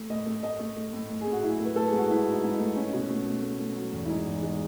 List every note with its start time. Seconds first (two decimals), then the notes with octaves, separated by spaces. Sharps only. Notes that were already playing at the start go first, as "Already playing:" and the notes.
Already playing: A3
0.10 A2 D#5
0.26 A3
0.43 A3 D#5
0.59 A3
0.76 A3
0.93 A2
1.10 A2
1.21 G#4
1.26 A2
1.32 F#4
1.43 F#3 E4
1.59 A3
1.65 B4
1.76 A3 A4
1.87 G#4
1.93 G#2
1.98 F#4
2.10 A3 E4
2.26 F#3
2.32 D#4
2.43 G#2
2.54 D#4
2.59 A3
2.76 A3 C#4
2.93 B2
3.09 A3
3.26 A3
3.42 A3
3.59 A3
3.76 F#3
3.93 E2
4.05 E4
4.09 G#3 D#4
4.26 E2
4.43 G#3